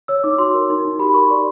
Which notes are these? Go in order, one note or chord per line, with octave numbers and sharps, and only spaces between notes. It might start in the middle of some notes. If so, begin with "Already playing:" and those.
C#5 E6
D#4 D6
F#4 C6
A#4
D#4
D#4
G4 B5
A#4 C#6
D5 C6